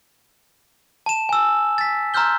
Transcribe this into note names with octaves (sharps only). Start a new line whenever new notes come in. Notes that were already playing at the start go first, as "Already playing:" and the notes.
A5 E7
G#5 E6
A6 B6
A#5 C6 E6 F6 G6 G7